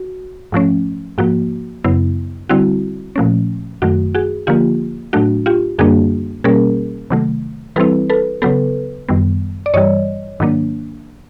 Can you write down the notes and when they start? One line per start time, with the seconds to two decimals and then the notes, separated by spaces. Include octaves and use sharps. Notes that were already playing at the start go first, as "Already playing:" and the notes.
Already playing: F#4
0.52 G#2 F3 A3 C#4
1.18 G#2 F3 A#3 F#4
1.84 F#2 C#3 F#3 B3 E4
2.49 D3 G3 C4 E4 F#4
3.16 A#2 F3 A3 C#4
3.82 F#2 D#3 F#3 A3 F#4
4.15 F#4 G#4
4.47 D3 F3 A#3 F4 G4
5.13 A2 F#3 A3 D4 F#4
5.46 F4 G4
5.79 F#2 D3 G3 A#3 D4 F#4 G#4
6.44 B2 G3 A#3 C#4 G#4 A#4
7.10 C3 D#3 F#3 A3
7.76 E3 G3 C4 E4 A4 B4
8.10 A4 B4
8.42 C#3 F#3 B3 A4 B4
9.09 F#2 D#3 G3 B3
9.66 D5
9.74 G2 E3 G3 C#5 D#5
10.40 G#2 D#3 F#3 A#3 D4